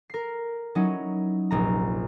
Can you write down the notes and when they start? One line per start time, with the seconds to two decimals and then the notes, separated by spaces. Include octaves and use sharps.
0.10 A#4 C7
0.75 F#3 C#4 D#4 E4
1.51 F1 A#1 A#5